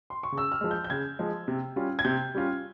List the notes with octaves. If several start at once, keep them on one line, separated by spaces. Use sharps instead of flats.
C6
C#6
C#3
E6
F6
F3 G#3
G6
G6
C#3 G#6
F3 G#3
C3
G3 C#4 F4
G#6
C3 G6
G3 C#4 F4